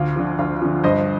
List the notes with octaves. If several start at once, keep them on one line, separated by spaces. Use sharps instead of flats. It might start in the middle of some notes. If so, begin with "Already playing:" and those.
Already playing: D2 F4
D3 F3
D2 F4
D3 F3
G2 C5 D#5